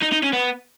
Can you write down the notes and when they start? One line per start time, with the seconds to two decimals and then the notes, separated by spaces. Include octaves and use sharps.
0.02 D#4
0.12 D#4
0.23 C#4
0.33 B3